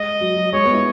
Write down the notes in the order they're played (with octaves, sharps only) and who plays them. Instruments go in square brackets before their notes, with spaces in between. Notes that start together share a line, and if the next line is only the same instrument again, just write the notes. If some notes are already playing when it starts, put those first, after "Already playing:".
Already playing: [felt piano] G#3 [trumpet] D#5
[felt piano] F#3
F#3
[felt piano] G#3 [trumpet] C#5
[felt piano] B3
E4